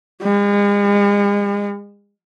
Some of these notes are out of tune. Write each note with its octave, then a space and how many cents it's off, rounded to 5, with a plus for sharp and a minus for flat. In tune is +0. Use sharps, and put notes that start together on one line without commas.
G#3 -40